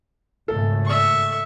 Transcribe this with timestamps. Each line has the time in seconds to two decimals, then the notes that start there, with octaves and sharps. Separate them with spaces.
0.48 G#1 C#3 A3 A4
0.85 E5 C#6